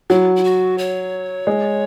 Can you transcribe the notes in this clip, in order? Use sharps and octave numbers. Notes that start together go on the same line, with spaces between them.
F#3 E4
E4
F#4
C#5
G#3